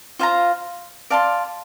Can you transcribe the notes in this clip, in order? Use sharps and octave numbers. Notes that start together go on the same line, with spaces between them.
F4 C5 F5 A#5
D5 F5 A5 C6